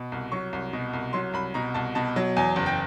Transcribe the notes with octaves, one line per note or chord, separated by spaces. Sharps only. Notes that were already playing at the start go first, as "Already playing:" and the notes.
Already playing: B2
C2
F#3 C#6
C2
B2
C2
F#3 C6
C2 B5
B2 A#5
C2 A5
B2 A5
F#3
E2 G#5
F#1
G5